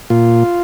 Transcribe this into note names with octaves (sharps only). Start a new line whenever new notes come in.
A#2 F4